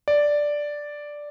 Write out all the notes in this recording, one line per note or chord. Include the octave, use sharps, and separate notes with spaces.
D5